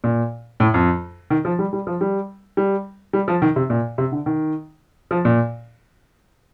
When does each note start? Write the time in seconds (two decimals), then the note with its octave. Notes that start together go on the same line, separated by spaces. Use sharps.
0.04 A#2
0.60 A2
0.74 F2
1.30 D#3
1.45 F3
1.59 G3
1.73 G3
1.87 F3
2.01 G3
2.57 G3
3.13 G3
3.28 F3
3.42 D#3
3.56 C3
3.70 A#2
3.98 C3
4.12 D3
4.26 D#3
5.11 F3
5.25 A#2